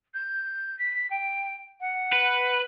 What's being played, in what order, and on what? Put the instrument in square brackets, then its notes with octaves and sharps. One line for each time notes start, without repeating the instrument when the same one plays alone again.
[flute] G6
B6
G5
F#5
[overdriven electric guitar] B4